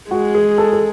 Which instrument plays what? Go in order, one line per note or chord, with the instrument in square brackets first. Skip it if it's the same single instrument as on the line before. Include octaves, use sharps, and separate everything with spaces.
[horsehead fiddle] G#3 [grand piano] F#4
[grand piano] G#4
A4
A4